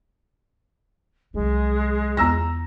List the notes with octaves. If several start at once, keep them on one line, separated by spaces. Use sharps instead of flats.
C2 F#3 G#3
E2 B3 A#5 E6 A#6